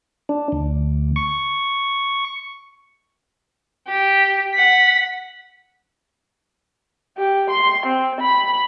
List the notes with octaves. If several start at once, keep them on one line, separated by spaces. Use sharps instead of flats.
D4
D2
C#6
G4
F#5 B6
G4
C6
C4
B5